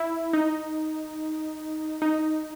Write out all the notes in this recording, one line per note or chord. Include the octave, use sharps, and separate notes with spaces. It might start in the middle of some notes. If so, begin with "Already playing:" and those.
Already playing: E4
D#4
D#4